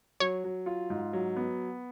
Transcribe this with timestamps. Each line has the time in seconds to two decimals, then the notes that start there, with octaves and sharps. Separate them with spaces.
0.20 F#3 C#5
0.44 F#3
0.66 F4
0.90 G#2
1.13 F#3
1.37 B3